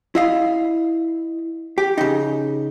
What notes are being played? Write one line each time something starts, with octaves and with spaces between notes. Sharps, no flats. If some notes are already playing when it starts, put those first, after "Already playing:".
E4 D#5 F5
G4
C#3 D#4